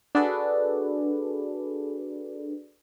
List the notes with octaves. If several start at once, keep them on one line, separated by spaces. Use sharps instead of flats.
D4 F#4 G#4 A4 B4 D5